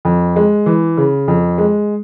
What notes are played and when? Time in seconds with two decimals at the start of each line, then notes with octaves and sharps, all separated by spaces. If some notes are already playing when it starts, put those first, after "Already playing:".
0.05 F2
0.36 G#3
0.66 E3
0.97 C#3
1.28 F2
1.58 G#3